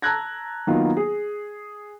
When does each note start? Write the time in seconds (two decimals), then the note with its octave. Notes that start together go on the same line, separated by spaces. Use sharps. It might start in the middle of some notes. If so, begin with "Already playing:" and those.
0.02 A5 A#5 E6 F#6 G#6 A#6
0.67 D#3 F#3 A#3 B3 D#4 F4
0.97 G#4